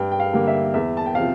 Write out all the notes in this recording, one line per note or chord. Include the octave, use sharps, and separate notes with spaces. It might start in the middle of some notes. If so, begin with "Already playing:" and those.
Already playing: G2 G5
G5
F5
D3 G3 A#3
E5
E2 E5
A5
G5
C3 F3 F5